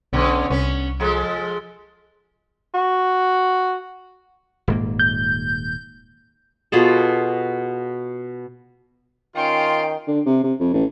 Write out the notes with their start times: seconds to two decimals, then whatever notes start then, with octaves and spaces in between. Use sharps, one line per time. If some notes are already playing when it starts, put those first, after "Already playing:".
0.13 B1 B2 D3 C#4
0.50 C2 B3 C#4
1.00 F3 G#3 A4
2.74 F#4
4.68 D#1 G#2 A#3
4.99 G6
6.72 B2 F4 G#4 A4
9.36 D#3 C#4 F4 G5 C6 D7
10.08 D3
10.26 C3
10.44 C3
10.60 F2
10.74 A1